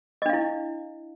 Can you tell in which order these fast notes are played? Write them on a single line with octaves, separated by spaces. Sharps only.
D#5 D4 F5 E4